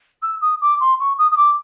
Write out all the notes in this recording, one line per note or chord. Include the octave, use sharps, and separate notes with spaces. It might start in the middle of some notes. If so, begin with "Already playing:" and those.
E6
D#6
D6
C6
C#6
D#6
D#6
D6